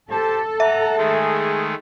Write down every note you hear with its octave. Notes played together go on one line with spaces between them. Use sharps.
G4 A4 C5 A5
E5 F#5 A#5
D#3 G#3 A3 G#4